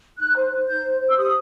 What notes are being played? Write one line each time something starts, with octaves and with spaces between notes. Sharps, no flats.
D#4 F#6
C5
C5
D#4 G6
C5
C5
E6
G4 D#6